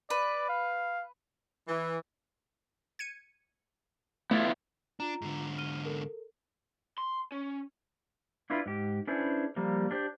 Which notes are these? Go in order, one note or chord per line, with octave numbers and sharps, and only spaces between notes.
B4 D5
F5
E3
G#6 C#7 D#7
A3 B3 E4 F4
D4 F4 A#5
G#2 D3
F6 D#7 G7
A4 A#4
C6
C#4
D4 E4 F4 B4
G#2 G4
C#4 D4 E4 G#4 B4 C5
F3 G3 A#3
D4 G4 C5